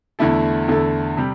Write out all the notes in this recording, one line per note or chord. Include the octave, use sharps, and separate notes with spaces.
E2 D3 A3 E4 A4
E2 D3 A3 E4 A4
C3 G3